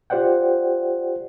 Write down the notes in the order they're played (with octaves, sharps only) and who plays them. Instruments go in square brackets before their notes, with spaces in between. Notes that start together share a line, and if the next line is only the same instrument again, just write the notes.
[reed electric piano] F4 G4 C5 D5 F#5 G5